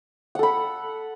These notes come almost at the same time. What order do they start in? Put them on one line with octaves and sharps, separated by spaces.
F#5 A4 B5